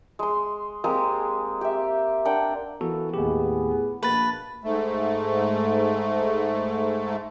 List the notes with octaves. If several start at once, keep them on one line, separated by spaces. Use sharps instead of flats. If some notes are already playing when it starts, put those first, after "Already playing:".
G#3 C6
G#3 A#3 C4 G4
G4 E5
D4 A#4 F#5 G5
E3 A#3 B3 F#4 A4
D#2 A2 B3 G4 G#4
A#1 B2 A#3 B4 A5 A6
G#2 A3